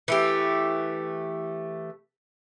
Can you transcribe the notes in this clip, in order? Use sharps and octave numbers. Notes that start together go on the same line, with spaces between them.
E3 A3 G4